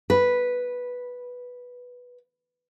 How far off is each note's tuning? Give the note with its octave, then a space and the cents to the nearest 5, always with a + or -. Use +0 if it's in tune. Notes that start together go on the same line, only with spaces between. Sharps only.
B4 -5